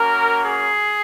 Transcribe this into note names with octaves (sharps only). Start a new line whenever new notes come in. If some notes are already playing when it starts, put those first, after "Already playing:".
Already playing: A#3 C#4 F#4 A#4
G#4